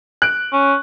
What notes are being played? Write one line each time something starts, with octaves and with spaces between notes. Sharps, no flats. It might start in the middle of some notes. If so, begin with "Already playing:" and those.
F#6 D7
C#4